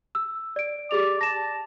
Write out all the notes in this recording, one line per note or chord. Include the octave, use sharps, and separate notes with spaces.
E6
D5 D7
G4 G#4 D5 F7
A5 A#6 E7